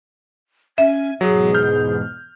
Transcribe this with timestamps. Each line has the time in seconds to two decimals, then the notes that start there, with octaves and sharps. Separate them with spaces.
0.78 C#4 E5 G#5
1.21 E2 G#2 B2 F#3 G#4
1.54 F6 G6